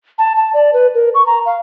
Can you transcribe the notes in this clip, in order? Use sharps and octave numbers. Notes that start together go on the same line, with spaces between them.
A5
A5
D5
B4
A#4
C#6
A#5
F5